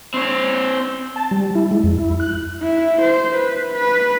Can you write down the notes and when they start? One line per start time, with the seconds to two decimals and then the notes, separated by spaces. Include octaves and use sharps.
0.14 C4 C#5
1.16 A5
1.31 G3
1.55 E4
1.71 G#3
1.83 F2
1.98 E4
2.20 F#6
2.63 E4
3.02 C5
3.35 B4
3.73 B4